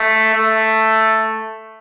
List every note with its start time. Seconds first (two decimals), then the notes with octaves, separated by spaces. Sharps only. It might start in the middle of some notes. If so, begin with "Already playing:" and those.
Already playing: A3
0.34 A3